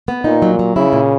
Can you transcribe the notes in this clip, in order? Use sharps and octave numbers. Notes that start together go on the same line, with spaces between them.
B3
A#2 D#4
F#3
F#3
C#3 E4
A#2